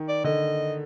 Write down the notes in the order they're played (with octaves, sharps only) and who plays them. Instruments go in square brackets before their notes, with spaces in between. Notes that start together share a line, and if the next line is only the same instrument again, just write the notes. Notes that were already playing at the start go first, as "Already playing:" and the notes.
Already playing: [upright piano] D#3
[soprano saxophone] D5
[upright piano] D3 [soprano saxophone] D#5